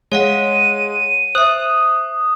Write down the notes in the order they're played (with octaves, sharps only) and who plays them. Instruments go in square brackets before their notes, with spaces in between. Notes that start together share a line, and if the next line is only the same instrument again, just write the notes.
[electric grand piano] G#3 [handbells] C#5 F5 F#5 [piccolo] D#7
[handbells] C5 E5 [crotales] D#6 [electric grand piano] F#6